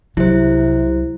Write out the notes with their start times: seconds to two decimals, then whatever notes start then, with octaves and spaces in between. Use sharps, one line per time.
0.17 C2 C3 F#3 E4 C5